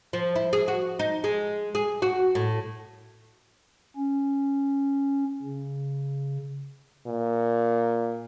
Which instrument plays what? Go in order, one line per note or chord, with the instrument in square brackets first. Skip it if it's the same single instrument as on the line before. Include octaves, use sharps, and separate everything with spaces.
[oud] F3
E4
G#4
F#4
D#4
G#3
G#4
F#4
A2
[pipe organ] C#4
C#3
[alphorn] A#2